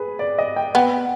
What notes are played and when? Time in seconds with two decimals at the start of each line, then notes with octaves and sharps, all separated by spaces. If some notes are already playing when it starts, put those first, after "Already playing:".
Already playing: G#4 B4
0.19 D5
0.38 D#5
0.56 G5
0.75 B3 G5